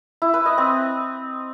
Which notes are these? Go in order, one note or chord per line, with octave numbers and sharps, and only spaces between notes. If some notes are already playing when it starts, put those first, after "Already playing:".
E4
B4
D#5
C4